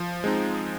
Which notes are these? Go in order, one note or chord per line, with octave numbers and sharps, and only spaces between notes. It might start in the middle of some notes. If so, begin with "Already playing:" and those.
Already playing: F3
G#3 C4 D#4